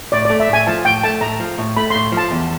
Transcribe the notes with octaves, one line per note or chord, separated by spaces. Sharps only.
A2 D5
D5
A3
E5
A2 G#5
F3 A5
A2 G5
A3 A5
A2 A#5
F3
A2
A3 B5
A2 C6
F3
A5
E2